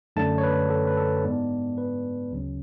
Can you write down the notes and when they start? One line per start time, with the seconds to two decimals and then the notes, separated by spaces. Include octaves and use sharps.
0.16 F#2 D3 A3 D4 A5
0.38 C#5
0.43 B4
0.70 A4
0.87 B4
0.97 A4
1.24 G#2 G#3 B3 D4
1.78 B4
2.31 D2 C#3 F#3 C#4